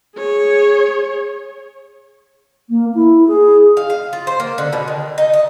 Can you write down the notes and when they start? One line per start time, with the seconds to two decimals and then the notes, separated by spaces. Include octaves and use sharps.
0.16 G#4 C#5
2.69 A#3
2.95 E4
3.28 G#4
3.77 F5
3.90 F5
4.13 F4
4.27 C5
4.40 A#3
4.58 D3
4.73 B2
4.88 D#3
5.18 D#4
5.34 D#5